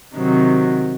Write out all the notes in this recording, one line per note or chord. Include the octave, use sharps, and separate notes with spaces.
C3 D#3 F#3